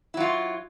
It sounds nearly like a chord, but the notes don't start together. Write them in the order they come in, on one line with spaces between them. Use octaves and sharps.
E4 F#3 F4